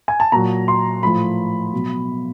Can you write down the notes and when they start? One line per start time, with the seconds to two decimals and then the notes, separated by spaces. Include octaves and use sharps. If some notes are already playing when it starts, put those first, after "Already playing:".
0.08 G#5
0.20 A5
0.32 A#2 F#3 A#5
0.68 C6
1.03 A2 F3 B5
1.73 B2 F#3